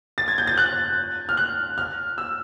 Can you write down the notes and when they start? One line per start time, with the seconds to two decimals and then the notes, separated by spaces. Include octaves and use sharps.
0.18 A6
0.28 G#6
0.38 G6
0.47 A6
0.58 F#6
1.29 F6
1.37 F#6
1.78 F6
2.18 E6